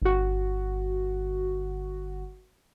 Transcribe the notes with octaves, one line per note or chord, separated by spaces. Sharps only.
G1 F#4